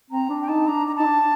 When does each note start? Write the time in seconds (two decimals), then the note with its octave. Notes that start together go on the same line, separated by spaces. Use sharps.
0.10 C4 A#5
0.29 D4
0.42 G5
0.48 D#4 A5
0.68 D4 A#5
0.87 A#5
0.96 D#4 A5
1.05 D4